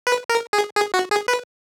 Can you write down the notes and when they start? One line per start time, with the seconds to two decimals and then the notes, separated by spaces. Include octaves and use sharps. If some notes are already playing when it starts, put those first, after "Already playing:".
0.07 B4
0.29 A#4
0.53 G#4
0.76 G#4
0.94 F#4
1.10 G#4
1.28 B4